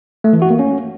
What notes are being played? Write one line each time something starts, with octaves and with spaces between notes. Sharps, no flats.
A3
E3
F#4
A#3
C#4